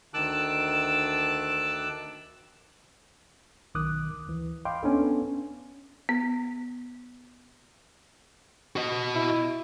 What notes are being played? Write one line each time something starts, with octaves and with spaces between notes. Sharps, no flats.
D2 D#3 A5 D6 E6 F#6
B1 D#3 D6 D#6 F#6
D2 E3
D#5 F5 G5 B5 C6 D6
B3 C#4 D4 A4
B3
F#4 D#5
E4